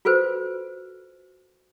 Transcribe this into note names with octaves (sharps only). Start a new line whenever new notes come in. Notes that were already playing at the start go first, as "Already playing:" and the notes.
F4 F#4 A4 B4 C5